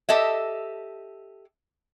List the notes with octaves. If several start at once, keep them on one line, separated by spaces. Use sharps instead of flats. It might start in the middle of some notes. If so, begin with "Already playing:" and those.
G4 A4 D#5 E5